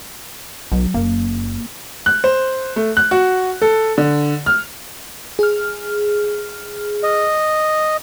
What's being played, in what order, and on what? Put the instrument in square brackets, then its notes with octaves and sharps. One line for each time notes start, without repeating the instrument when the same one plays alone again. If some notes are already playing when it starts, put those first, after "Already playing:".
[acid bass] B1 [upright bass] F#3
[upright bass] F#1 [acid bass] A#3
[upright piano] F#6
C5
A3
F#6
F#4
A4
D3
F6
[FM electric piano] G#4 F6
[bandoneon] D#5